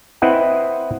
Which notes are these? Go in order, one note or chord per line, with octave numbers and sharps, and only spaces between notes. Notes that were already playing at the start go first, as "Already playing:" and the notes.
C4 E4 B4 D#5 F#5